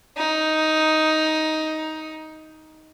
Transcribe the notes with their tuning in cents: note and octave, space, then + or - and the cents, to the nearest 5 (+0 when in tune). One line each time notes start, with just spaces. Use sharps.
D#4 +10